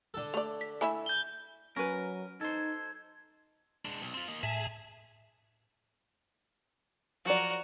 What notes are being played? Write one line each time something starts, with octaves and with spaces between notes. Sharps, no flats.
D3 A4
A3 D5 F7
B6
A3 E4 E5 G#5 B5 E6
G6 G7
F#3 C#4 A#4 B4
D#4 A4 C5 G#6
G#3 D4
B1
C4 F4
A#3 D#5
A2 G#4 E5 G#5 A5
F3 F#3 F#4 A#4 D5